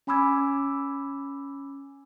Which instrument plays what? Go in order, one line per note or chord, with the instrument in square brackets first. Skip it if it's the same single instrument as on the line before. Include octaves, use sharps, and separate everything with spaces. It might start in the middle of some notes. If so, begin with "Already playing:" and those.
[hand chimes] C#4 G#5 B5 D6 E6 G#6